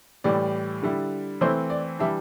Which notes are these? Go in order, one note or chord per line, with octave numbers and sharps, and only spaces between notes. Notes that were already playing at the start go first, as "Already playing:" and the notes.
A2 E3 G3 D5
D3 G3 E4
E3 A3 C4 E4 C5
D5
E3 G3 D4 E5